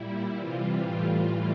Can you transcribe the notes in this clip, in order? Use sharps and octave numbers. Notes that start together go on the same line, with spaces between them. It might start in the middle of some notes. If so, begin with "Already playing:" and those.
Already playing: A#2 G3 E4
C3 E3 G3 F4
A2 E3 G3